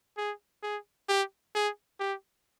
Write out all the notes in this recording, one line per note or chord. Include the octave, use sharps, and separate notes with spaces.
G#4
G#4
G4
G#4
G4